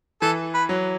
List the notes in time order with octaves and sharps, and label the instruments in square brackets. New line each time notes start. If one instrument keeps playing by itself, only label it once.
[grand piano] E3 [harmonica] A4
[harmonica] B4
[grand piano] F#3